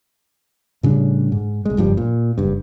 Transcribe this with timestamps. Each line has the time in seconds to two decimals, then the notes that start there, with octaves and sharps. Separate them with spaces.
0.83 A2 C#3 G3 D4
1.32 G#2
1.65 C2 G#3
1.77 F#1 G2 F3 G3
1.97 A#2
2.38 F#1 G2